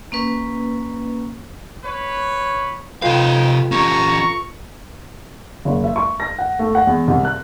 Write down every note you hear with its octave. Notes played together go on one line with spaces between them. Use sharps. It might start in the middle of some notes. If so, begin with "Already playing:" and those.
A#3 C#4 B4
B4 C#5
C3 D#4 F4 A4 B4 F5 G5
C#4 G4 A#5 C#6
F#1
E5
C#6
A#6
F#5
A3
F#5
E2
C2
F#6